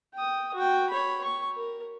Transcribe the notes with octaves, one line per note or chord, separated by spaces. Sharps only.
G5 D#6
F#4 G5
C#5 B5
C#6
A#4